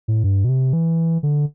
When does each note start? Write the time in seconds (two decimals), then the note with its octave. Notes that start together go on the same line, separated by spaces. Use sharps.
0.08 A2
0.24 G2
0.44 B2
0.49 C3
0.73 E3
1.23 D3